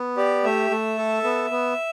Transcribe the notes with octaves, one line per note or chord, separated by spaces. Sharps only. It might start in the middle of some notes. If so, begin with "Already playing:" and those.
Already playing: B3
G4 D5
A3 E5
A3
A4
B3
B3